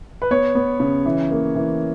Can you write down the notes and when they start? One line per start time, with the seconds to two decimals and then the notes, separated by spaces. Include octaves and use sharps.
0.22 B4
0.31 B3 C#5
0.55 B3
0.80 C#3
1.06 E3
1.31 A#3
1.55 E3